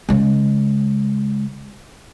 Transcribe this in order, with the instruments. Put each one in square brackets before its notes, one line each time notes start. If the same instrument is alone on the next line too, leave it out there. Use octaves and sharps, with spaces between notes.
[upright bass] C#3 G#3